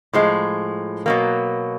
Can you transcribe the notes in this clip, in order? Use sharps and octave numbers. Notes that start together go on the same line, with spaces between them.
A2 F3 G#3
B2 F#3 A#3